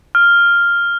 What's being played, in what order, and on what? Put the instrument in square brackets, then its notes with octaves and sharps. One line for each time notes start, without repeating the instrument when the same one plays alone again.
[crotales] F6